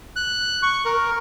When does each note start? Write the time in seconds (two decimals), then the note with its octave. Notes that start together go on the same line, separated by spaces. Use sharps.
0.16 F#6
0.63 C#6
0.85 A#4